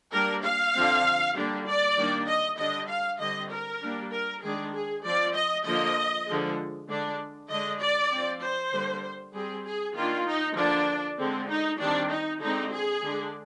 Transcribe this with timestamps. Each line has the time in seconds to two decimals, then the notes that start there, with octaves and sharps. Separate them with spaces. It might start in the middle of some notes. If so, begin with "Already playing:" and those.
0.12 G3 A#3 D4 A#4
0.43 F5
0.74 D3 F3 C4
1.35 D3 G3 A#3 D4
1.66 D5
1.97 D#3 G3 A#3 D4
2.27 D#5
2.58 D3 G3 D4 D#5
2.88 F5
3.20 D3 G3 C4 D#5
3.50 A#4
3.81 G3 A#3 D4
4.12 A#4
4.42 D#3 G#3 D4 G#4
4.73 G#4
5.04 F3 C4 D5
5.34 D#5
5.65 D3 F3 A#3 D#5
6.27 D3 F3 G#3
6.88 D3 G#3 D4
7.49 D3 G#3 D4 D#5
7.80 D5
8.11 F3 C4
8.42 C5
8.72 D3 G3 A#3
9.34 G3 C4 G#4
9.65 G#4
9.95 D#3 A#3 D4 F4
10.26 D#4
10.57 D3 F3 A#3 D4
11.18 D3 G#3 C4
11.49 D#4
11.80 D#3 G3 C4 D4
12.10 D#4
12.41 D3 G#3 C4 D#4
12.72 G#4
13.02 D3 G#3 D4